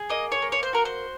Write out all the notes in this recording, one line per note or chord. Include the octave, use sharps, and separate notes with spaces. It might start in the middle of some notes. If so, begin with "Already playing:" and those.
Already playing: G#4
A#3 D#5
C#5
A#3
C#5
C5
F#4 A#4
C5